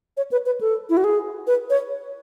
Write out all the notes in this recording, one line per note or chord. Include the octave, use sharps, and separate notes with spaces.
C#5
B4
B4
A4
E4
F#4
G#4
B4
C#5